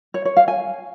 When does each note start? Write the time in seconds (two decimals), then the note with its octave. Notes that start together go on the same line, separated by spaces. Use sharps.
0.14 C#5
0.25 C#5
0.37 F5
0.48 G#5